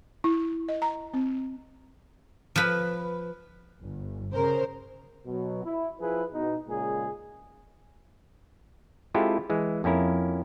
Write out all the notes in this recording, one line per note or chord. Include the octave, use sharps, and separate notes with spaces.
E4
D#5
A#5
C4
F3 B4
G1
C#3 A#4 C5
B2 F#3
E4
F3 E4 G#4 B4
B2 D#4
A#2 C#3 G#3 G#4
G#3 C4 E4 F4 G4 A4
E3 G#3
F2 A#3 C#4 E4 A#4